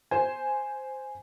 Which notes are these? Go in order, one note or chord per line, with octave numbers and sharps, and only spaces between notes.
C5 G#5